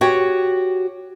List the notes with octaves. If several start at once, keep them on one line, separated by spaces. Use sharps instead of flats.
F#4 G4 C#5 G5